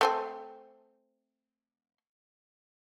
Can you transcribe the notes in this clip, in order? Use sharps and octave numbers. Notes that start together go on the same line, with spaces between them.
A3 C4 G#5